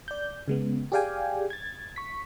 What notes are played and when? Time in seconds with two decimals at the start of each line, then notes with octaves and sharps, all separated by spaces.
0.08 D5 G6
0.48 C#3 G#3 B3
0.92 G4 G#4 D5 F5 G5 G#5
1.50 G#6 A6
1.96 C#6 B6